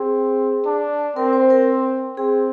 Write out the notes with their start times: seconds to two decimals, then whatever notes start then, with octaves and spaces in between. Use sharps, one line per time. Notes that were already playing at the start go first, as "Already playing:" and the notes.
Already playing: C4 G#4
0.65 D4
1.16 C4 A#4
1.33 C5
1.50 A#4
2.17 C4 G#4